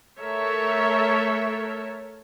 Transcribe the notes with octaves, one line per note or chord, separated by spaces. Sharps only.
A3 A4 A#4 C#5 E5